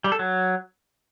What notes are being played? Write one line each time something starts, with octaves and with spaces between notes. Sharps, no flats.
G3
A4
F#3